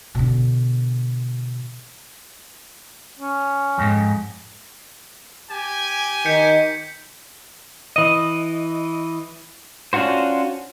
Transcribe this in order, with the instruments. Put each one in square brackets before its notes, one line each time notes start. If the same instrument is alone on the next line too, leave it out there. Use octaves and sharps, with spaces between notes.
[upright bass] B2 D3
[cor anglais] C#4
[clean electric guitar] F2 G#2
[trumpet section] G4 G#5
[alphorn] D#3 [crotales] G6 B6 C#7
[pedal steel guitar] E3 D#5
C#4 D4 F4 F#4 C5